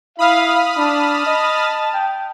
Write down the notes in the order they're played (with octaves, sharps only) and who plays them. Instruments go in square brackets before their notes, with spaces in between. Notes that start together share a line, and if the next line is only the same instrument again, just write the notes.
[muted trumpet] E4 [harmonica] F5 [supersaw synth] B5 D#6 F6
[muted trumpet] D4 [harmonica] A5
[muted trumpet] D#5
G5